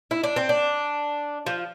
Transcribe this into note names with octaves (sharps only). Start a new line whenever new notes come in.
E4
D4
C4
D4
F3